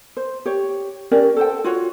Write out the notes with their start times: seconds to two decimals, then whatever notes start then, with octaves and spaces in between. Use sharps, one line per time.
0.17 C5
0.45 G4 C#5
1.11 C#4 G4 A#4 D5
1.37 A4 C5 G5
1.64 F4 F#4 C#5